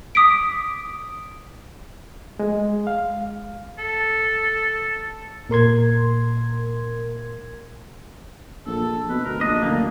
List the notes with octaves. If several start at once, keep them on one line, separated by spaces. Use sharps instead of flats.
D6 D#6 B6 D7
G#3
F5
A4
A#2 A#4 C6 G#6
A#1 A4
B2 B4
D2 A#4
A#1 D4 D#5
F#1 D2 A#3